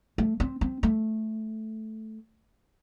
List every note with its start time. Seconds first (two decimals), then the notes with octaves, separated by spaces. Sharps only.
0.18 A3
0.40 C4
0.61 C4
0.83 A3